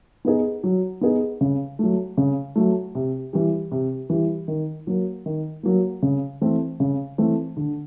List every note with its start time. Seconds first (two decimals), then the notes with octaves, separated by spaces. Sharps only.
0.25 B3 D#4 G#4
0.64 F#3
1.01 B3 D#4 G#4
1.41 C#3
1.79 F#3 A3
2.17 C#3
2.56 F#3 A3
2.95 C3
3.33 E3 G3
3.72 C3
4.10 E3 G3
4.48 D#3
4.87 F#3 A#3
5.26 D#3
5.63 F#3 A#3
6.02 C#3
6.41 E3 A3 C4
6.80 C#3
7.18 E3 A3 C4
7.57 D3